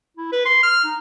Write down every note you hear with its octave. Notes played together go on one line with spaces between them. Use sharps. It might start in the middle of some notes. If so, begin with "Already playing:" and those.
E4
B4
C6
F6
D#4